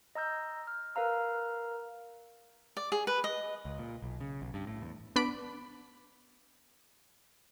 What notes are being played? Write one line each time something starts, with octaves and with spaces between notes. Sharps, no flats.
D#5 A#5 E6 G6
F6
A#4 B4 F5 A#5 E6
D5
G#4
B4
D#5
C#2
A#2
B1
C#3
B1
G2
A2
E2
B3 D4 B5 D7